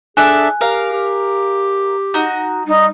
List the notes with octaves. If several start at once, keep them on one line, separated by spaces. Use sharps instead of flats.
D4 G#4 A4 E5 G#5 F#6
G4 A#4 F5
G4
D#4 F#4
G3 D#4